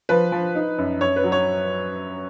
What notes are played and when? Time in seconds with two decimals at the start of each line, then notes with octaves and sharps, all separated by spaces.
0.09 F3 B4
0.32 F3
0.55 D#4
0.78 F#2
1.01 F#2 C#5
1.16 B4
1.24 F#3
1.32 C#5